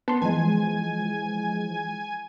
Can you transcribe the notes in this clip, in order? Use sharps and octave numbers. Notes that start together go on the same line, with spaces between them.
B3 A5 C6
E3 F3 G#3 G#5